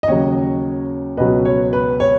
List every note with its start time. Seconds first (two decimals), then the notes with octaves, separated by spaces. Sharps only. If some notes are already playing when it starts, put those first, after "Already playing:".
0.03 D#5
0.08 D#2 C#3 F#3 C#5
1.17 C#2 B2 F#3 B4 D#5
1.45 C#5
1.73 B4
2.00 C#5